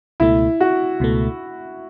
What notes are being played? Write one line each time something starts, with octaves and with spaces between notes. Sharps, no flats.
C#2 B2 A3 E4
F#4
C#2 B2 A3